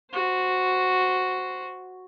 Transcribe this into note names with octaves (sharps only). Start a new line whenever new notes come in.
F#4 C5